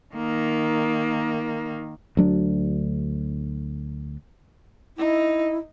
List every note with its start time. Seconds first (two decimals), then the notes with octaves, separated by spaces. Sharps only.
0.14 D#3 A#3
2.17 D2 F#3 D4
4.98 D#4 E4